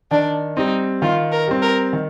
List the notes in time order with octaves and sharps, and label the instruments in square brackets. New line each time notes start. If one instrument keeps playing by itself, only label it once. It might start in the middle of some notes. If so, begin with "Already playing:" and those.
[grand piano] D#3 [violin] D4
[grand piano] G3 C4 [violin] D#4
[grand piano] D#3 [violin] F4
[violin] A#4
[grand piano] G3 C4
[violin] A#4
[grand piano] D#3